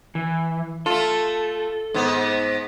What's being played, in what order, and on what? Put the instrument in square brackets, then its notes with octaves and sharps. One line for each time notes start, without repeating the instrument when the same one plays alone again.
[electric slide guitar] E3
[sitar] A3 F4 [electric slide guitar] A4
[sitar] G#2 B3